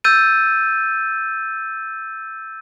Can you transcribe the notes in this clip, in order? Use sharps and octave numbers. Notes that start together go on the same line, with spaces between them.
E6 G6 A6 D#7